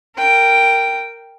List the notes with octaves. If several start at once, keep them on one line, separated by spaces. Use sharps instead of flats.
A#4 G5